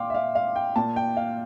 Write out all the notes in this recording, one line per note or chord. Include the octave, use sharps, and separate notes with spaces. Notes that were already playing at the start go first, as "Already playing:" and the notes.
Already playing: A#2 F5 G5 C6 D6
E5
F5
F5
G5
A#2 A5
G5
F5